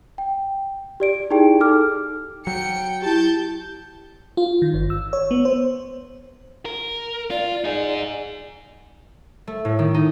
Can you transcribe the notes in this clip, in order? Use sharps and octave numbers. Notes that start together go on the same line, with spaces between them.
G5
G4 D5 D7
D#4 E4 G4 G#4 G5
D#4 A4 D6 F6
F#3 G5 C#7
E4 G4 A5 G6
F4
D#3
G1
E6
C#5
B3
C5
A#4
F4 D5
D#4 G#4
A3
A2
D#3
D#4